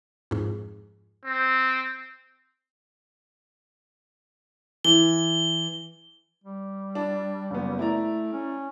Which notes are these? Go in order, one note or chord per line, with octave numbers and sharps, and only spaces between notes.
F2 G#2
C4
E3 G7
G3
D4
F#1 B3
A3 E4 D5 A#5
C#4